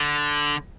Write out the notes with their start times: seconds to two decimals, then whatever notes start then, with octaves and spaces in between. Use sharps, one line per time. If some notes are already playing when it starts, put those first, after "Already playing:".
Already playing: D3